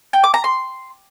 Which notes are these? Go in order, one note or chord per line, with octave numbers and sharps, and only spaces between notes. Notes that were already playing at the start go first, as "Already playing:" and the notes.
G5
D6
A#5
C6